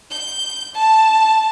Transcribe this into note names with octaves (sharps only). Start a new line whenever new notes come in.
G6
A5